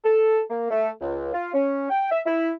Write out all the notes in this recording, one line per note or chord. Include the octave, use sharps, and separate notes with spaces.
A4
A#3
A3
C#2
F4
C#4
G5
E5
E4